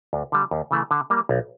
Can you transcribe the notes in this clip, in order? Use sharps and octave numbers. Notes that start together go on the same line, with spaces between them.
D2
D3 G3
D#2
C#3 E3 A3
D3
G3 A#3
B1